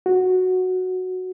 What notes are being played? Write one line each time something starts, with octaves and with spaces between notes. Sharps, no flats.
F#4